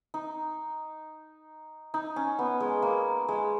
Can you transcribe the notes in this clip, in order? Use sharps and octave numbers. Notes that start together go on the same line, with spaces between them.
D#4
D#4
C#4
B3
G#3
A#3
G#3